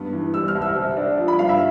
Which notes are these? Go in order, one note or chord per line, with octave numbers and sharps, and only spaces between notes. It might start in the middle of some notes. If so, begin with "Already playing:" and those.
Already playing: G2 B3
E3
G3 E6
F6
C2
E6
C3
D4
F3
B5
G2 F5
E5